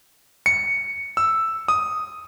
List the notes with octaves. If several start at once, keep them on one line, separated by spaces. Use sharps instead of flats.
C#7
E6
D#6